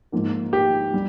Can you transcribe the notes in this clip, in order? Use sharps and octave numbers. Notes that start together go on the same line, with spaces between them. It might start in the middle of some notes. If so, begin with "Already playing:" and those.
G#2 F3 A#3
G4
G3